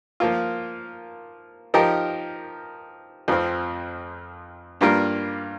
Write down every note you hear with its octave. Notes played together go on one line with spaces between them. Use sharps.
F3 A#3 F4
F3 D#4 G4 A#4
F2 F3 C4
G2 G3 A#3 F4 A#4